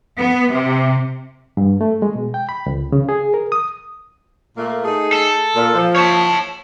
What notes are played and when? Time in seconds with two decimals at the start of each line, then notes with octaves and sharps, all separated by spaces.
0.17 B3
0.50 C3
1.57 G2
1.81 A3
2.02 G#3
2.15 B2
2.34 G5
2.49 B5
2.66 C#2
2.92 C#3
3.09 G#4
3.34 A#4
3.52 D#6
4.56 A#2 A3 A#3
4.84 A3 D#4 G#4
5.13 A4
5.55 A#2
5.74 F3
5.96 C#5 A5